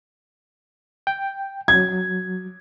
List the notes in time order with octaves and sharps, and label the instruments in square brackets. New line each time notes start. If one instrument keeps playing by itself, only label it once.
[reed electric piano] G5
[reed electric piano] F#3 [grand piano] G#6